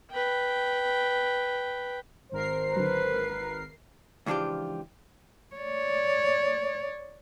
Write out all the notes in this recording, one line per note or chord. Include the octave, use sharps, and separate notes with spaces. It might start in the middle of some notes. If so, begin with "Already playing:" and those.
B4 G5
G#1 A#4 C5 C7
D3 F#3 B4
C#2 E3 F3 D4 F4 G4
C#5 D5